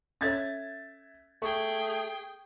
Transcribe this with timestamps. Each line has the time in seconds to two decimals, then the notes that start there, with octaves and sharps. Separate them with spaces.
0.21 C#4 A4 C#5 E5 G#6 A6
1.42 A3 G#4 G5 C#6